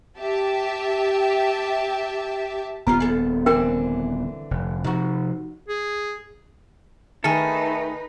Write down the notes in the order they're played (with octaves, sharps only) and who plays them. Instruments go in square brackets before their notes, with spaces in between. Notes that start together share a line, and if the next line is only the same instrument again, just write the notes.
[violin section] G4 E5 A5
[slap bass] D#1 B3 [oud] F4 G4 A#4 [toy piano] A#5
[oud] G#4 A4
[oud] D3 E3 C4 [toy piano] C#4 A#4 G5
[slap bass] F1
[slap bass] C3 F3 [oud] D#4 F#4
[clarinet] G#4
[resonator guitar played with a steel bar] D#3 G#4 [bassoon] A3 [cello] D#4 B4 [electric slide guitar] A4